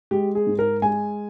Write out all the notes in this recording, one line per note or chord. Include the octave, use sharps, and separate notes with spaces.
G#3 G4
G#4
G#2
A#4
G#3 G#5